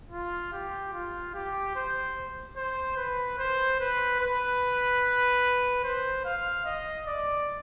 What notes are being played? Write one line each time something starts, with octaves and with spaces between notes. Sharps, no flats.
F4
G4
F4
G4
C5
C5
B4
C5
B4
B4
C5
F5
D#5
D5